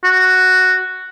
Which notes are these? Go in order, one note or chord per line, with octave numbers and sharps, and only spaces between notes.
F#4